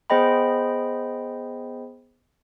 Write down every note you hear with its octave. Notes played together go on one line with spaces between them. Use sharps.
B3 G#4 C5 D#5 G5 B5